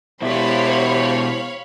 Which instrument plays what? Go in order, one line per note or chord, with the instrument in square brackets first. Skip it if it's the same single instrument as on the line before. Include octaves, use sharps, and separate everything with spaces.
[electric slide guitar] B2 E4 [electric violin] G4 C5 [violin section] C#5 F5 B5